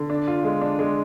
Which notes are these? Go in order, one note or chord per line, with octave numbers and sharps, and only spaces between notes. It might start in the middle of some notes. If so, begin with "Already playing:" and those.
Already playing: D3
D4
F4
G#3
D4
G#3